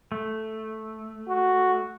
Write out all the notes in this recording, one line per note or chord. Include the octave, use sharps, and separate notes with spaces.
A3
F#4